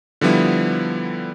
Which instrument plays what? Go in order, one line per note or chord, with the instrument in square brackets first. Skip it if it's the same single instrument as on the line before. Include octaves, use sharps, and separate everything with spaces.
[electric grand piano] D3 F3 G3 B3 E4